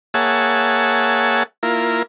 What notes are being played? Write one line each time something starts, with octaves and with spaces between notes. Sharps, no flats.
A#3 G#4 C#5 E5 F#5 A5
A#3 E4 F4 A#4